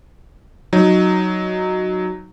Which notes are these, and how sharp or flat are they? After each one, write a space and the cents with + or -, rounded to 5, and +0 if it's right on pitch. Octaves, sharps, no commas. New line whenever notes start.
F#3 +0 D#4 +0